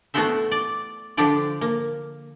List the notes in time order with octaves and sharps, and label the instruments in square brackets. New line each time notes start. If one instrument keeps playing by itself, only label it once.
[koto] A3 B3 E4 F#4 C5 E5
D5
D3 F3 D4 G4 D5
A#3